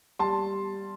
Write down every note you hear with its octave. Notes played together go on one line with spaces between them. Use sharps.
G3 A5 C6